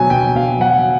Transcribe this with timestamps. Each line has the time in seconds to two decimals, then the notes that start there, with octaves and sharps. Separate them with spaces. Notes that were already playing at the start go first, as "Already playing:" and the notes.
Already playing: B2 F#3 G#5
0.10 B2 G5
0.35 B2 F5
0.61 F#3 F#5